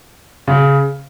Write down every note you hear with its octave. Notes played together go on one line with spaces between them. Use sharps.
C#3